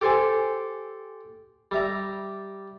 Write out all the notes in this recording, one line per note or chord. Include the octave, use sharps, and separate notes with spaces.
G4 A4 C5 G#5
G3 E5 A#5